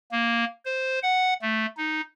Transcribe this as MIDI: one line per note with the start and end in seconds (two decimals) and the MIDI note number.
0.12 0.44 58
0.65 0.99 72
1.03 1.34 78
1.42 1.66 57
1.77 2.01 63